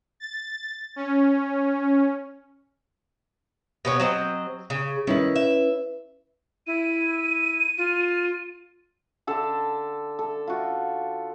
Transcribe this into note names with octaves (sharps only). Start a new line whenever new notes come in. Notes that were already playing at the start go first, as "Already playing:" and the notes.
A6
C#4
B2 B3 C#4
F#3 C4 D#5
C#3
D#3 C#4 E4 B4
E5
E4 D#7
F4
D3 A4 A5
A4
F4 F#4